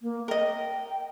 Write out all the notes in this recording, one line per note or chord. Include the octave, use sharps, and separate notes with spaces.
A#3
A#4 D#5 G5